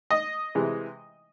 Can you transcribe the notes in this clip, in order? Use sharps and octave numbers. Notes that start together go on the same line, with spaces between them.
D#5
C3 E3 G#3